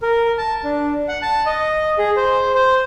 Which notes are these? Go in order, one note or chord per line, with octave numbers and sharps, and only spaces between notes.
A#4
A5
D4
F#5
A5
D#5
G#4
C5
C5